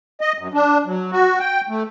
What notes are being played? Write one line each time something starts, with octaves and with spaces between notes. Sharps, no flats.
D#5
F#2
D4
F#3
F#4
G5
A3